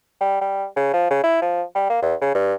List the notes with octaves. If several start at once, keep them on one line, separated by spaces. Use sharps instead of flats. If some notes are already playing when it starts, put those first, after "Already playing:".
G3
G3
C#3
F3
C#3
E4
F3
G3
A#3
E2
C#3
G2